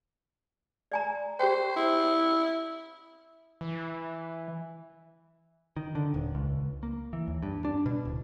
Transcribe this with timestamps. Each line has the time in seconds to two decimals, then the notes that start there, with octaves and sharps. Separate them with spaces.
0.92 D5 G#5 A#5
1.40 G4 C5 G5
1.76 E4
3.61 E3
5.77 D#3
5.95 D3
6.14 D#1
6.35 C#2
6.83 A#3
7.13 E3
7.28 D#2
7.43 G2
7.65 D4
7.86 B2
8.05 D1